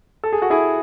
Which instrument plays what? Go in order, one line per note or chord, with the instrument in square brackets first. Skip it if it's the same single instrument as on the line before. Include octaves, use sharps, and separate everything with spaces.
[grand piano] A4
G#4
F#4
E4 G#4